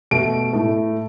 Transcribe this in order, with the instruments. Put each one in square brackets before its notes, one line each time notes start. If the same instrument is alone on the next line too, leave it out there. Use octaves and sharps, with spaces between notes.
[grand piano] B2 A3 D7
A2 A3